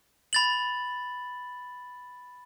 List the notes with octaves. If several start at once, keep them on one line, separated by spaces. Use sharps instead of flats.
B5 A6 F#7